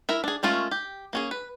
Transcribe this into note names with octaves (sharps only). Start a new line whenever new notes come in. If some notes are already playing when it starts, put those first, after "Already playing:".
E4 A#4 E5
D4 G#4
G#3 A3 C#4 F4 A#4
G4
A#3 C#4 G#4
B4